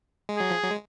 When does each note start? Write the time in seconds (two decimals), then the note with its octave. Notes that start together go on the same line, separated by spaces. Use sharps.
0.29 G#3
0.38 F#3 G#4
0.51 F3
0.64 F#3
0.71 G#3